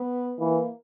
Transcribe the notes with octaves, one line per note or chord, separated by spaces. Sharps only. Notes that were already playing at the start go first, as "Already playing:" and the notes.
Already playing: B3
E3 A#3